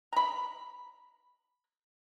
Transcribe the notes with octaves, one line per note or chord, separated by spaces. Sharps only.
A#5 B5